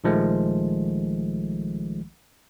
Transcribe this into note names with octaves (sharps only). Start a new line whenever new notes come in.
A#1 D#3 F3 G#3 A3